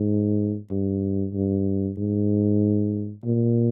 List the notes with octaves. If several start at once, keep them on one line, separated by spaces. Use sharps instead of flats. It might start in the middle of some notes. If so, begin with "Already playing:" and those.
Already playing: G#2
G2
G2
G#2
A#2